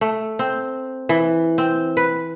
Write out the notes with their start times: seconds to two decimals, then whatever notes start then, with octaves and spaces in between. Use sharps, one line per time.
0.01 A3
0.39 C4
1.09 E3
1.58 C4
1.97 B4